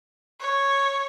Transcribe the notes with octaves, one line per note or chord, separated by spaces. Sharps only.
C#5